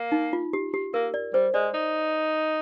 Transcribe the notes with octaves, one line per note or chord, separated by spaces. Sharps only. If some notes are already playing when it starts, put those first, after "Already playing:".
Already playing: A#3
D#4
F4
G4
G4
A#3 A#4
D5
G3 C5
G#3 D5
D#4